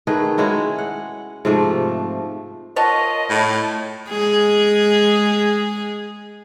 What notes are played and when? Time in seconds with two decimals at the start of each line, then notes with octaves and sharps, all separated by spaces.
0.07 D#3 A3 G#4 B4
0.38 G#3 C#4 E4 F#4
0.78 F#5
1.45 G#2 C3 F3 A3
2.76 F4 A#4 C#5 D#5 F#5 A5
3.30 A2
4.09 G#3 G#4